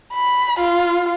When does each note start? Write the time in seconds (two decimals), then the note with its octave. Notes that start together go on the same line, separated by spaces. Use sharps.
0.13 B5
0.59 F4